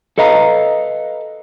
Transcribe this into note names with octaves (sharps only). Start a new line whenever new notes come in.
A4 B4 D#5 F5 A#5